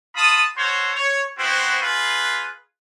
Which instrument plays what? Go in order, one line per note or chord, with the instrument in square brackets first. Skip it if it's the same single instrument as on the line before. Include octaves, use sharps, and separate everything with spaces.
[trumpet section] F4 A5 B5 D#6
F#4 A4 C5 C#5 C6
C#5
B3 C4 E4 F#4 C5
F4 G#4 B4